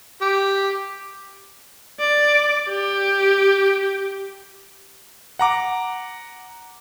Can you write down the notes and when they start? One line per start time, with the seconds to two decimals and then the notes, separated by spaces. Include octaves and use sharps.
0.21 G4
2.00 D5
2.69 G4
5.39 F#5 A#5 D6